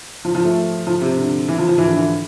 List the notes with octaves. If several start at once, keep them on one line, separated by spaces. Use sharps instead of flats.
F3
F3
A3
F3
C3
D3
E3
F3
F3
E3
D3
E3